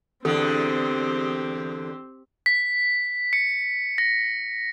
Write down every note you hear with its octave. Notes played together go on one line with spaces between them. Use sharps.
E2 D3 C4 G4 A4
B6
C#7
A#6